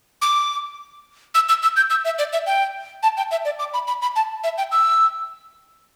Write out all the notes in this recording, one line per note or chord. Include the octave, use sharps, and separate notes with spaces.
D6
E6
E6
E6
G6
E6
E5
D5
E5
G5
A5
G5
E5
D5
D6
B5
B5
B5
A5
E5
G5
E6